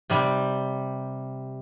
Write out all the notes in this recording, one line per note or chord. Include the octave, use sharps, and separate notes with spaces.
C3 G3